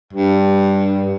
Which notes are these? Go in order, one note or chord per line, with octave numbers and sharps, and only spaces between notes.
G2